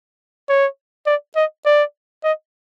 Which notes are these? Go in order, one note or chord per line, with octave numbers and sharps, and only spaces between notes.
C#5
D5
D#5
D5
D#5